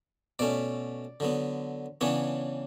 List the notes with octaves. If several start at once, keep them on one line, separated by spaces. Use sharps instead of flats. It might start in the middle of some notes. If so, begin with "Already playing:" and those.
B2 A3 C#4 D5
D3 F#3 B3
C#3 E3 B3 D4 C#5